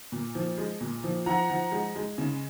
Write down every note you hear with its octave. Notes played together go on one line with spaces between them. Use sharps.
A#2
F3
G#3
A#2
F3
F3 F#5 A#5
F3
G#3
G#3
C#3